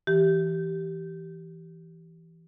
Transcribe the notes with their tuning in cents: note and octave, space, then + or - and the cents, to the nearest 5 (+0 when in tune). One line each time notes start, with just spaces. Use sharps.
E3 +0 G4 -15